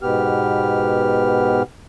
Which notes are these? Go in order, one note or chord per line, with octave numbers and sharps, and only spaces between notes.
G#2 B2 B3 G4 F6